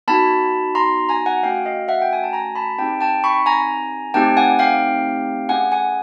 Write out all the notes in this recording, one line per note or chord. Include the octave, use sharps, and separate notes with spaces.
B3 D#4 F#4 A5 B5
A#5 C6
G#5 A#5
F#5 G#5
A3 C#4 F#4 F5 G5
D#5 F5
E5 F#5
G5
G#5
A5
G#5 A#5
A5 B5
C4 D#4 G4 G5 A5
G5 A5
B5 C#6
G#5 A#5
A3 C4 D#4 G4 G5 A5
F#5 G#5
F5 G5
A3 C#4 E4 G#4 F#5 G#5
F#5 G#5